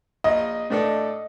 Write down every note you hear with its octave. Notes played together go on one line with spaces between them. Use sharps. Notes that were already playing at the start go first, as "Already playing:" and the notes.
A#1 D#5
A2 A3 D4 A4